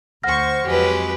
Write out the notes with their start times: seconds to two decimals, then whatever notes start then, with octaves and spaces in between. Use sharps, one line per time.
0.23 D2 C5 F#5 C#6 F6 A#6
0.66 F2 F#3 G#3 G4 B4